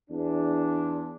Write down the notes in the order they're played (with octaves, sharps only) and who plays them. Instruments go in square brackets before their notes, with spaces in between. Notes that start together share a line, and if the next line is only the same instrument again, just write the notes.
[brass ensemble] E2 D4